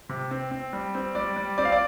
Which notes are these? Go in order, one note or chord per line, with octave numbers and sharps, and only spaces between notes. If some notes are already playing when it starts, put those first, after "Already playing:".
C3
C4
C4
G3
C4
G3 D5
G3
C4 D5
F5
D5